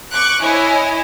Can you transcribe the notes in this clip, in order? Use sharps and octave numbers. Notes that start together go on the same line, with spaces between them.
C#6 D6 F#6
E4 C#5 D#5 G#5